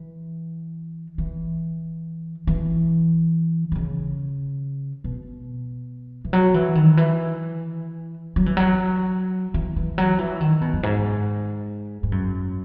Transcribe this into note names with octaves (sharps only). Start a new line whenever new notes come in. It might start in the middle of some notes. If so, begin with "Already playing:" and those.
Already playing: E3
E3
E3
D#3
C#3
B2
E3
F#3
E3
D#3
E3
F#3
E3
F#3
E3
E3
F#3
E3
D#3
B2
F#2
G#2
G#2
F#2